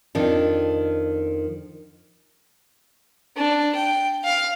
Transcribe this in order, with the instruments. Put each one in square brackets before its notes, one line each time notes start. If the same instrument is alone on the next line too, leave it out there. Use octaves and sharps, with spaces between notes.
[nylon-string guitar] F2 D#3 D4
[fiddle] D4
G5
F5